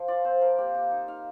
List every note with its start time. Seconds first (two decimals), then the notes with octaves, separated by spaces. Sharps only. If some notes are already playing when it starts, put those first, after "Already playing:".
Already playing: F3
0.08 F4 D5
0.25 C4 C5
0.41 F3 A#4
0.58 A#3 G4
0.75 A#3 G4
0.91 D#4
1.08 D#4 F5